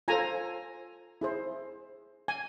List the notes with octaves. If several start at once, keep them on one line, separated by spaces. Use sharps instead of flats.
F4 A4 C5 G#5 A#5
E4 G#4 C5
G#5